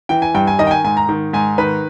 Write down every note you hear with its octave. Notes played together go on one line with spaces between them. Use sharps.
E3 G5
G#5
G2 G5
G#5
D#3 D#5
G5
G#5
G#2 G#5
A#5
D#3
G#2 G#5
D#3 B4